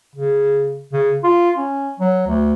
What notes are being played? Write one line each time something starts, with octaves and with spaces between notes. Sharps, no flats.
C#3
C#3
F4
C#4
F#3
D2